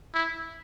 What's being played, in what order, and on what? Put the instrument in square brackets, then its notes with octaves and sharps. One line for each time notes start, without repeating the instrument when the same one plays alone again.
[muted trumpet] E4